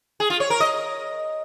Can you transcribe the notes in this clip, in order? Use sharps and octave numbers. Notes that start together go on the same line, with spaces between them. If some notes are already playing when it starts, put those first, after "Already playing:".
G#4
F4
C#5
A#4
D#5